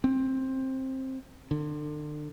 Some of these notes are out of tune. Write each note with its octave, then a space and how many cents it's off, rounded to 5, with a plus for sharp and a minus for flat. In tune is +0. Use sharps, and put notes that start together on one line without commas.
C4 +15
D3 +35